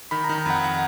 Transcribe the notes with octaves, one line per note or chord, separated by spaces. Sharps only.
D#3 B5
A#5
D#3
A#5
F2 F#5
F#5